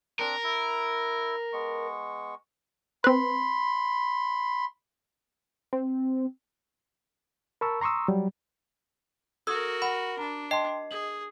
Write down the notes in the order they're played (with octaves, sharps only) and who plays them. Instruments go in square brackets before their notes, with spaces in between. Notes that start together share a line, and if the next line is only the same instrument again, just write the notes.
[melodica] C4 D4 [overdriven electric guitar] A#4
[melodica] E4
G#3 B3 C#6
[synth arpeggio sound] C4 B4 [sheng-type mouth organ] B5 C6
[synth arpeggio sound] C4
[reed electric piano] A#4 A5 B5 C#6 E6
A#5 C6 C#6 D#6 E6
F#3 G3
[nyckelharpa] F#4 A#4 [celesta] A4 D#6 G#6 [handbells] E6
[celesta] F#5 [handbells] B5
[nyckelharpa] D4 [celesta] A#5
[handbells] D#5 C7 [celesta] G5 A5 C6
[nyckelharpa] G#4 [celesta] F#7